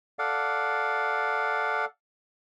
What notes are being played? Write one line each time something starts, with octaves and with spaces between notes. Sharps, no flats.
A4 D5 F5 F#5